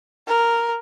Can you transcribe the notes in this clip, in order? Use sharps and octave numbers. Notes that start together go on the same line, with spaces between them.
A#4